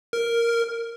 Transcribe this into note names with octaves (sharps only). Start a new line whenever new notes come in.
A#4